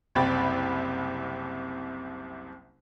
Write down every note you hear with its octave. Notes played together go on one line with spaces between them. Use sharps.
F#1 C2 C3 G5 B5 A6